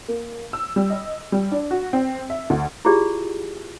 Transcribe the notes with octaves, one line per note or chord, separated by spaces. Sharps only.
A#3
E6
G3
D#5
G3
D4
F#4
C4
E5
D2
E4 F4 G4 G#4 D5